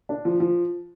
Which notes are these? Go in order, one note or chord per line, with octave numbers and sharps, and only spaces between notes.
D4
F3
F3